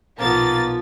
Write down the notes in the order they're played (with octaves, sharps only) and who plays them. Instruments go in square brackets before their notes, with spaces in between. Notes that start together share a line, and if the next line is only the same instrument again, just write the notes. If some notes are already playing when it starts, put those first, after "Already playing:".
[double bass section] B1 A#2 [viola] F3 [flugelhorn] A#3 [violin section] B3 A6